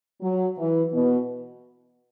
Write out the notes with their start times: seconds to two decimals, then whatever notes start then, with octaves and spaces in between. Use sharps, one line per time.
0.22 F#3
0.57 E3
0.93 B2